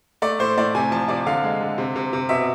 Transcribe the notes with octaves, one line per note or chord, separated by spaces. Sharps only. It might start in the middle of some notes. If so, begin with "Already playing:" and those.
A3 D5
A2 C5
A2 D5
C3 G#5
F3 A5
C3 D5
D3 F5
G#3
D3
C3
C3
C3
B2 E5